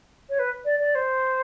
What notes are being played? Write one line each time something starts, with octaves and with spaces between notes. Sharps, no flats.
C#5
B4
D5
D5
C5